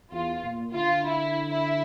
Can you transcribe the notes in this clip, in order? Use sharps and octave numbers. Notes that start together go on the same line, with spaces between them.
E2 F4
A#2
D3 F4
E4
E4